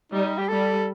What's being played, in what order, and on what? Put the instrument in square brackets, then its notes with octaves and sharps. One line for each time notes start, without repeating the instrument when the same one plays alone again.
[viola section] G3 [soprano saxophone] D#4
[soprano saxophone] G4
[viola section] G3 [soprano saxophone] A4